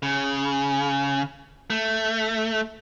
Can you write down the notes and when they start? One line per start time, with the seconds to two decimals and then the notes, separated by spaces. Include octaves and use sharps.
0.03 C#3
1.70 A3